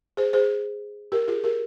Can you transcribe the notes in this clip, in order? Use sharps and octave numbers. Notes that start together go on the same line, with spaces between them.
G#4 C5
G#4 C5
G4 A#4
F4 G#4
G4 A#4